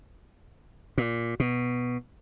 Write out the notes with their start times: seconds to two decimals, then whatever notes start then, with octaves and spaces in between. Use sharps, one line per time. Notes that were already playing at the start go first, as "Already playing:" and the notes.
0.98 A#2
1.40 B2